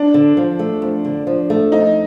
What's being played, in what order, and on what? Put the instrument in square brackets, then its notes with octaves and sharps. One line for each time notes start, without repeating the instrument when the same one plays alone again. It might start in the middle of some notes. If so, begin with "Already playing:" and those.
Already playing: [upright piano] D4
[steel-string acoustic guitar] D3
F3
A3
F2
D3
F3
A3
[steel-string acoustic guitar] F2 [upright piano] D#4